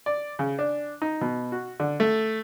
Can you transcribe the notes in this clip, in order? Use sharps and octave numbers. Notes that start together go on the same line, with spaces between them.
D5
C#3
D4
D#4
B2
F#4
D3
A3